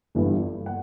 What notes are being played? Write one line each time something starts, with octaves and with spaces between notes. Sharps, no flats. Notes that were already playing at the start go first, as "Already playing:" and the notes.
G1 G2 E3 G3
F#5